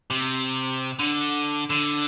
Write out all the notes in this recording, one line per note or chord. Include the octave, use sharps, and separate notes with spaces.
C3
D3
D3